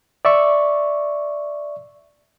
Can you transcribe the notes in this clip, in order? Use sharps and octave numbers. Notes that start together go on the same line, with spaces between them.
D5 E5 C#6